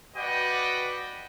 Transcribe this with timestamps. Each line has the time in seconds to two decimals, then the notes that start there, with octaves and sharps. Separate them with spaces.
0.17 F#4 B4 D5 D#5 F#5 G5